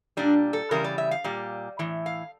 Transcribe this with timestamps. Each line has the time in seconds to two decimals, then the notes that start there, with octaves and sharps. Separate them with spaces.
0.17 A#2 G3 D4
0.53 A4
0.71 C#3 E3 G3 A#4
0.84 D5
0.98 E5
1.11 F5
1.24 A#2 G3
1.79 A2 E3
2.06 F5